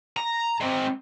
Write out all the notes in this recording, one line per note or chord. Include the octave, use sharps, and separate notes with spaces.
A#5
G#3 C4